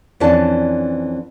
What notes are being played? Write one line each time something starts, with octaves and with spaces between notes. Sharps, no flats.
F2 E3 C#4 D4 A5